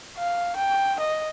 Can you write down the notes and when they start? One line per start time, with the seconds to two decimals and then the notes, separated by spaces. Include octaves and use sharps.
0.18 F5
0.56 G5
1.00 D#5